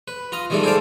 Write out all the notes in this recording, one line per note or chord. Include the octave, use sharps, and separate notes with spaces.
B4
F4 A#5 D#6
D#3 E3 G3 G#3 A4
G#4 A4 C5 D5 F5 A5